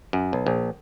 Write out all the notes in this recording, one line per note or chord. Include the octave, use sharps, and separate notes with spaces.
F#2
B1
A#1